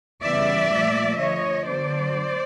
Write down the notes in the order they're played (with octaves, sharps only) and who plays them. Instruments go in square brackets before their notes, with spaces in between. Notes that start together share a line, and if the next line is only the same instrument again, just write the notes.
[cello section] C#3 E3 G3 B3 D5 E5
A#2 F3 A3
D3 F3 A3 C#5 D#5
D3 F#3 B3 C5 D5